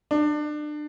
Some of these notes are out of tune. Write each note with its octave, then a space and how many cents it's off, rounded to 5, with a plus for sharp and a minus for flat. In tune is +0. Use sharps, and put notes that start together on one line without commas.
D4 +30